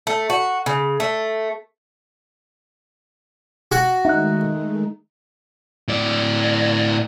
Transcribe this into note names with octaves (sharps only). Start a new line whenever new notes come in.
A3
F#4
C#3
A3
F#4 F#5
D#3 G#3 A3 D#4 E5 F#6
A2 D5